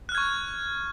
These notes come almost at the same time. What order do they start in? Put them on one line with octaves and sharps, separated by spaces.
F#6 F6 G#6 C#6